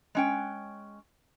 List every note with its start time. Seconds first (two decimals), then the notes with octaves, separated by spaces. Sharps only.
0.15 G#3 C#4 G5